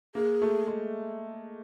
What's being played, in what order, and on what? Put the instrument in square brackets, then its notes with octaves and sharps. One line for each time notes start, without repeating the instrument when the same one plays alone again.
[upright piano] A#3 [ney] G#4
[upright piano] A3
G#3